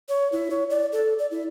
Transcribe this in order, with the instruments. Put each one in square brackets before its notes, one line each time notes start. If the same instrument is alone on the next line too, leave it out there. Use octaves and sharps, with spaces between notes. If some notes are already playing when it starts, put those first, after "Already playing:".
[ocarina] C#5
E4
C#5
D5
A4
D5
E4